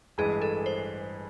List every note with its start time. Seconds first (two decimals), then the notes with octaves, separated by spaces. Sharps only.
0.18 A1 G2 E3 G#3 G#4
0.42 A4
0.66 C5